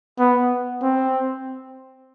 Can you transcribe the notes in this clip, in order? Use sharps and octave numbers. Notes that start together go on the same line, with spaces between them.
B3
C4